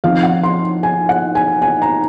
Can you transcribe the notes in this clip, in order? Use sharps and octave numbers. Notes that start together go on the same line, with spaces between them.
F3 C4 D#4 F5
F#5
C6
G#5
F#5
G#5
G#5
A#5